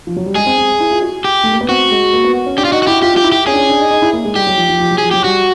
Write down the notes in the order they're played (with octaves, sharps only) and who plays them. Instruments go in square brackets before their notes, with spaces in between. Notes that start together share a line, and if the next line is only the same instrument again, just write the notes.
[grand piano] F3
F#3
G3
[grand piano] G#3 [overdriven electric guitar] G#4
[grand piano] C4
C4
E4
F4
F#4
[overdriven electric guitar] G4
[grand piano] A3
A#3
B3
[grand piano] C4 [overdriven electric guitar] F#4
[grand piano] G#3
A#3
B3
C#4
[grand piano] D4 [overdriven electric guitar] G4
[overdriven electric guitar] F4
[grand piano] D#4 [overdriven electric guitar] F#4
[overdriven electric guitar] F#4
[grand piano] E4 [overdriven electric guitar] G4
[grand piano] F4 [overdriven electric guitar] G4
[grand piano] F4 [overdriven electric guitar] G4
[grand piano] E4
[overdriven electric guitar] G4
[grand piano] C#4 [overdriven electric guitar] G#4
[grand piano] D4
C#4
D4
D#4
D#4
E4
A#3
G#3
[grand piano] G3 [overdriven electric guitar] G4
[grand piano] F#3
F3
F3
F3
F#3
[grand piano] F3 [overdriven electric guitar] G#4
[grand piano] F#3 [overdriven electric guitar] G4
[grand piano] G3 [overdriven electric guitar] F#4